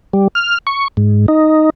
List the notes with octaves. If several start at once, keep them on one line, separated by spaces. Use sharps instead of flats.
G3
F6
C#6
G#2
D#4